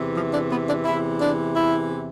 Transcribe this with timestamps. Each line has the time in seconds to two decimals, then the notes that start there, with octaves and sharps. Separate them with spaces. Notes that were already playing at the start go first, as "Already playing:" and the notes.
Already playing: E2 C3 E3
0.16 F3
0.33 D4
0.51 B3
0.68 D4
0.85 E2 C3 E3 E4
1.20 D4
1.55 E4